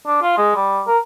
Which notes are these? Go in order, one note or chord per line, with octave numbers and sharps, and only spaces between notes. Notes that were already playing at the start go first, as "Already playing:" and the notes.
D4
F4
G#3
G3
A#4